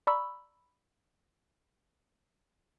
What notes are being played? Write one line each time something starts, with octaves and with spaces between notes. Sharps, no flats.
D5 A#5 B5 C#6 E6